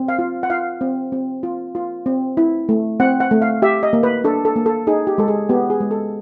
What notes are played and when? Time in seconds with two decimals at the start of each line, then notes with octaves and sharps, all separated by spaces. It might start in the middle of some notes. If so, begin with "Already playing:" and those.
Already playing: C4
0.08 F5
0.19 F4
0.43 F#5
0.50 F4 F5
0.81 C4
1.12 C4
1.43 F4
1.75 F4
2.06 C4
2.37 E4
2.69 A3
3.00 C4 F#5
3.20 F#5
3.31 A3
3.42 F5
3.62 G4 E5
3.83 D#5
3.93 A#3
4.03 B4
4.24 D4 A4
4.45 A4
4.56 A#3
4.66 A4
4.87 D#4 G#4
5.07 G4
5.18 G#3 A4
5.28 G#4
5.49 B3 G4
5.70 G#4
5.80 G#3
5.91 A4